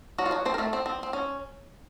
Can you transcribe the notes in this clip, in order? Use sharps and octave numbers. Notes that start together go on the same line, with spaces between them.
F#3 F#4
F4
F#3 F#4
C4 C5
A#4
A3 A4
C4
C4
C4
C#4